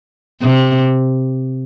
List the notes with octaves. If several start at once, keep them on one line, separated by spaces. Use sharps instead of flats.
C3